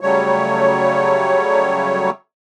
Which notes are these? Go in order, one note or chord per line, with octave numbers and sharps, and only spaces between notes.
C#3 F#3 G3 A3 C#5